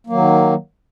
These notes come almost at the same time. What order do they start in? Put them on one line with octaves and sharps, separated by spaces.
A#3 F#3 D#3